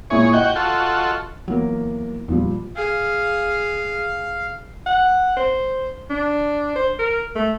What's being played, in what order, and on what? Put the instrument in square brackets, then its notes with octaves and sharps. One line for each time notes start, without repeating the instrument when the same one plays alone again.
[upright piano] A#2 E4 [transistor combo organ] G#4 C#5
[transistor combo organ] F#4 G5 [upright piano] D#5
[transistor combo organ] F4 F#4 A4
[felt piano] E2 A#3 A#4 [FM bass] F#3
[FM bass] E2 [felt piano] A#2 F3 G3
[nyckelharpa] G#4 [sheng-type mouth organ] F5
[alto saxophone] F#5
C5
D4
C5
A#4
A3